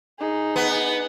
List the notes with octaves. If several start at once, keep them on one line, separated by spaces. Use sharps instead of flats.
D#4 G#4
B3